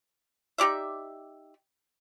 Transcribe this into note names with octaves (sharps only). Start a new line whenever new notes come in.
D#4 G4 D5 E5